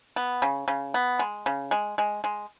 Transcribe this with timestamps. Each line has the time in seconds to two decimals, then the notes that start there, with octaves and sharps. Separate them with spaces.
0.16 B3
0.42 C#3
0.68 C#3
0.94 B3
1.19 G#3
1.46 C#3
1.71 G#3
1.98 G#3
2.24 G#3